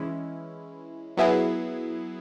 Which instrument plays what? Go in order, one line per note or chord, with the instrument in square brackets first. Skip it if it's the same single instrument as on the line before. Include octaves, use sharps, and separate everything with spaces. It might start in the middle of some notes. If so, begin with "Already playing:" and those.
Already playing: [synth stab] E3 G#3 C#4 E4
F#3 B3 E4 G#4